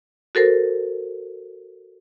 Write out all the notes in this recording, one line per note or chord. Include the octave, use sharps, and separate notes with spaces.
F#4 A4 A#4 C5